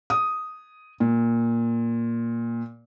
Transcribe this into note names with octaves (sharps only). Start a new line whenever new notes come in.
D#6
A#2